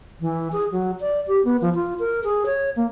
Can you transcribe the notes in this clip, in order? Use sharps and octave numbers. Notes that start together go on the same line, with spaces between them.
E3
G#4
F#3
D5
G4
B3
F3
F4
A#4
G#4
C#5
A#3